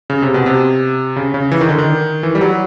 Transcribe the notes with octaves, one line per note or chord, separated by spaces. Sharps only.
C#3
C3
B2
C3
C#3
C#3
E3
D#3
D3
D#3
E3
G3
F#3